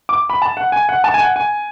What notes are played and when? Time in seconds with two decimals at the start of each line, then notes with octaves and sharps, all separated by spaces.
0.09 D6
0.30 B5
0.42 A5
0.57 F#5
0.72 G#5
0.89 F#5
1.04 A5
1.14 G#5
1.20 F#5
1.36 G#5